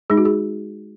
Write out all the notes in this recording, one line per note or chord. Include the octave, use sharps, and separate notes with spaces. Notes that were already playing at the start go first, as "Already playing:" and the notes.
G#3 D#4 G#4
F#4
G#4